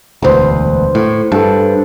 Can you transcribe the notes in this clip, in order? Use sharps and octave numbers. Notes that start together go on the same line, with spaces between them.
E1 D2 B4 C5 C#6
A2
G2 A4 A5